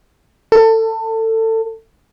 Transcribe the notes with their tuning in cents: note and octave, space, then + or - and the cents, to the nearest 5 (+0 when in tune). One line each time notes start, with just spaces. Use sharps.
A4 +25